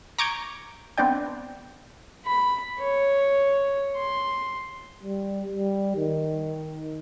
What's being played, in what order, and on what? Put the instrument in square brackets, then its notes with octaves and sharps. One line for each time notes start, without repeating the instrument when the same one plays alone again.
[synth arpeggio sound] A#5 C#6 D6 G6 G#6 D7
B3 C4 D4 D5 G5
[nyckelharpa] B5
C#5
C6
[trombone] G3
G3
D#3